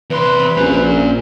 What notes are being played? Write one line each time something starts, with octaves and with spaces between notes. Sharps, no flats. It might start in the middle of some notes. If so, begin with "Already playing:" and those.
E2 C3 C4 B4 C6
A#1 A#2 C#4 A#5